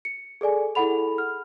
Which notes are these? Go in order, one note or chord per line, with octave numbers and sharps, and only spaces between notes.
C#7
G#4 A4 D5 G#5
E4 G#4 A4 F#5 B5 F7
F6